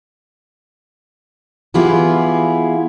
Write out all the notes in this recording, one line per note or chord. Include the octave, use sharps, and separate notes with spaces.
E3 B3 E4 F4 G4 G#4